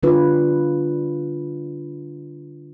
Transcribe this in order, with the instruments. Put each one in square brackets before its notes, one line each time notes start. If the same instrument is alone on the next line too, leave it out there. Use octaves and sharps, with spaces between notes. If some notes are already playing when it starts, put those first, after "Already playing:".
[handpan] D3 G3 D4 F4 B4